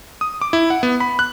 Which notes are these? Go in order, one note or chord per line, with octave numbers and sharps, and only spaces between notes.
D#6
D6
E4
F#5
B3
B5
F#6